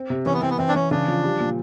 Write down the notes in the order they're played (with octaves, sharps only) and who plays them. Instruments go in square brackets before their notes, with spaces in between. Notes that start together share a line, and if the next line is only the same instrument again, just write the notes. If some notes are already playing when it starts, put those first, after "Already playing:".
Already playing: [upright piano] C4
C3
[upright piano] E3 [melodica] C#4
[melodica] B3
[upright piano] E3 [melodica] C4
[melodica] B3
[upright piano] E3 [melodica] C4
[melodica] D4
[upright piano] E3 [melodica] C#4
[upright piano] C#3 [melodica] D4
[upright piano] F3
G3
A#2